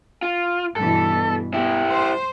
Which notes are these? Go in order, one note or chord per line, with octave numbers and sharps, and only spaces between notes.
F4
G2 B2 E3 A4
B3 E4 G4
C5